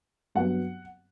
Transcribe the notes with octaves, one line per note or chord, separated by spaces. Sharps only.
G2 F#3 B3 F#5